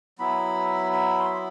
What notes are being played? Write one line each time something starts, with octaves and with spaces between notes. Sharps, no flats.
F#3 B3 E4 B5
B5
C6
B5